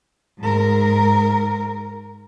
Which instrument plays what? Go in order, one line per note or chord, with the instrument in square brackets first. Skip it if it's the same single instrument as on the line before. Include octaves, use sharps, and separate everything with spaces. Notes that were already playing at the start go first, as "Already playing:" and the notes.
[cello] G#2 A#4